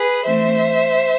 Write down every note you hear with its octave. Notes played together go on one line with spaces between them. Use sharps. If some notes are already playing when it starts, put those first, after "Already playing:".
Already playing: G#4 B4
E3 A3 C4 C5 E5